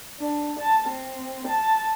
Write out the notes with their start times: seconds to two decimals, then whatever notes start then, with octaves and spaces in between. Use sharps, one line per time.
0.20 D4
0.60 A5
0.89 C4
1.48 A5